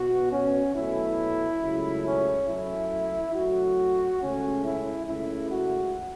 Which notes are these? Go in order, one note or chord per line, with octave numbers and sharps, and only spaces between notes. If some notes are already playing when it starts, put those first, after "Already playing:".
Already playing: B2 B3 F#4
C#4
B2 F#3 A3 E4
C#2 C#3 F#3 A3
C#4
F#2 F#3 A3 E4
F#2 F#3 A3 F#4
C#2 C#3 A3 C#4
E4
C#2 C#3 A3 E4
F#4